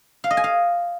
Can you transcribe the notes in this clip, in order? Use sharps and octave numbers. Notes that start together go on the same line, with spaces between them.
F5
D#5
G#5
F5